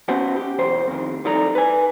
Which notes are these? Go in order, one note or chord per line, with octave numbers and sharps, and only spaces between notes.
B3 C#4 F#4 C5 F#5
G4
B1 E2 C5
F2 D#3
F2 G3 D#4 A4 D5 A#5
B4 G#5